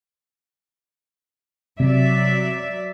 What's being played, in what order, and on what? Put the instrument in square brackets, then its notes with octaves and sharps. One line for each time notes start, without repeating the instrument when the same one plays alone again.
[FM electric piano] C3 [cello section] F#3 D5 E5